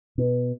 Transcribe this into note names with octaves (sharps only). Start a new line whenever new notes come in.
B2